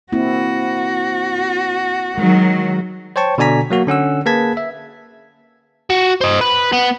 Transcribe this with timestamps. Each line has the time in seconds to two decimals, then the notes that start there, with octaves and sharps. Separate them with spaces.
0.13 A#3 C4 E4 F#4
2.18 D#3 F#3 G#3
3.16 C5 C#5 G5 A5 C#6
3.38 B2 D3 D5 G#5 A#5 B6
3.70 F#3 A#3 F#4
3.87 D3 C#4 F#5 E6
4.26 A#3 G#4 B4 A5 G#6 B6
4.57 E5
5.90 F#4
6.21 C5 D#5
6.41 B4
6.72 B3